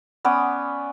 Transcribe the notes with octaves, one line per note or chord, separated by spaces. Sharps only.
B3 C#4 D5 D#6